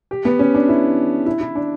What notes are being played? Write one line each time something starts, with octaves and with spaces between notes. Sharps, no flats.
G4
B3
C#4
D4
E4
E4
E4
D4